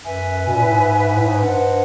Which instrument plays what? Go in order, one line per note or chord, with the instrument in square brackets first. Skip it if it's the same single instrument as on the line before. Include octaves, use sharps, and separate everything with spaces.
[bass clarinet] F#2 [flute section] B4 E5 G#5
[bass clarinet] B2
A#2
A2
G#2
G#2
A2
G#2
[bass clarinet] G2 [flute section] C5 D#5 F#5